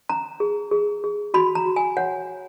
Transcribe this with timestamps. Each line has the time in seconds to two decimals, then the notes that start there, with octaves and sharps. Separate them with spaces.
0.09 C#4 A#5
0.40 G#4
0.71 G#4
1.04 G#4
1.34 F#4 B5
1.55 A#5
1.65 F#4
1.76 G#5
1.97 C#5 F#5